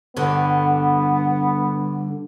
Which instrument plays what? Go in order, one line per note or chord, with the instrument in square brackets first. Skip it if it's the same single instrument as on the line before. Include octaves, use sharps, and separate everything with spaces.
[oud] G2 D3 [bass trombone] B3